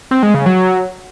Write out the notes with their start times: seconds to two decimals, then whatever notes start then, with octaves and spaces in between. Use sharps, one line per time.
0.11 C4
0.23 G#3
0.34 C#3
0.46 F#3